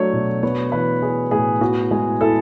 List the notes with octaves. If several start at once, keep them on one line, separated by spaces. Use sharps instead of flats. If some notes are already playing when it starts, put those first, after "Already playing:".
Already playing: F#3 A3 D4 C#5
B2
B3 C#5
E3 B4
E4 G#4
A2 G#4
B3 F#4
G#3 G#4
E4 A4